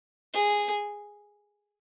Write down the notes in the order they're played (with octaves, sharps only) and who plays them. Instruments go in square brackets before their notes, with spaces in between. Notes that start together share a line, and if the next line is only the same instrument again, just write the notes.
[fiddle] G#4